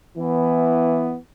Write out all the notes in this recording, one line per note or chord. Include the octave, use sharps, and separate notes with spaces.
E3 B3